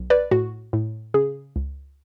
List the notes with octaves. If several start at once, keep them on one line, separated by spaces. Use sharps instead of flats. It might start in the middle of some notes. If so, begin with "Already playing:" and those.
Already playing: B1
B4 D5
A2 F#4
A2
C#3 G#4
C#2